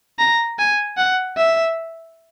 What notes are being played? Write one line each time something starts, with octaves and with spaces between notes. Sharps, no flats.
A#5
G#5
F#5
E5